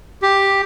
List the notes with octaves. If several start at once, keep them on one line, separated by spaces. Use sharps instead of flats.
G4